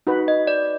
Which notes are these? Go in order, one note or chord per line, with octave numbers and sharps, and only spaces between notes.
D#4 F#4 B4
D#5
D5